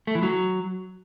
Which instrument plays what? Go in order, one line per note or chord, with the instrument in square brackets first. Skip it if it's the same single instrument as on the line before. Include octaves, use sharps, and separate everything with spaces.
[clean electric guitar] A3
E3
F#3